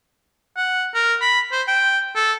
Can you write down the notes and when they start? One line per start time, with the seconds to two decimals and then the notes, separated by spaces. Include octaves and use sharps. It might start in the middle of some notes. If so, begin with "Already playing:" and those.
0.57 F#5
0.94 A#4
1.21 B5
1.52 C5
1.68 G5
2.16 A4